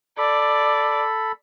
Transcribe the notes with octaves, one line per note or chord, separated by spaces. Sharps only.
A4 D5 B5